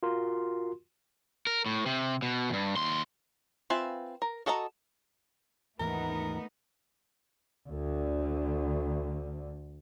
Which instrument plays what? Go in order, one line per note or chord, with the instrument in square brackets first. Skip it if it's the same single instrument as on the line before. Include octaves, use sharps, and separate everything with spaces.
[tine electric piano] F4 F#4 A#4 C6
[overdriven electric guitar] A#4
A2
C3
B2
E2 G2
D#2 C6
[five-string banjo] C4 F4 B4 E5 G#5
A#4
F#4 A4 D#5 A5 A#5
[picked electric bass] D#2 G#2 E3 [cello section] A3 B3 D#4 [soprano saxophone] A#4
[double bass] D2 D3